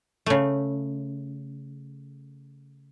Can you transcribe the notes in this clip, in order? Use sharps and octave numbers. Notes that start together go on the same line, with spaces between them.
C#3 A3